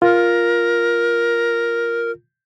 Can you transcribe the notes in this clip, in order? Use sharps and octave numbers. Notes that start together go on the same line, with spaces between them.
F4 A#4